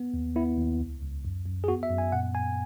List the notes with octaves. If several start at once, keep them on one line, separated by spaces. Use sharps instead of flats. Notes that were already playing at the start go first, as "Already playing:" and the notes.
Already playing: B3
D#2
B3 E4
D#2
C#2
C#2
F#2
F#2
G#4
B3 F#4
E5
F#2
G#5
A#2 F#5
A#2 G#5